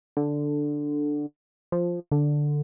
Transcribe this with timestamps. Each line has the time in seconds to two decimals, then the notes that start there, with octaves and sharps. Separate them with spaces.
0.17 D3
1.72 F3
2.12 D3